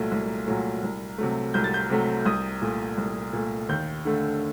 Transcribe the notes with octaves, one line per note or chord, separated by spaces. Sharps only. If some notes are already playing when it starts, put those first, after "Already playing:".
Already playing: C2 A#2 F#3 A3
C2
A#2 F#3 A3
C2
C3 F#3 A3
C2 G6
A6
G6
C3 F#3 A3
C2 D#6
A#2 A3
C2
A#2 A3
D#2 G6
D3 A3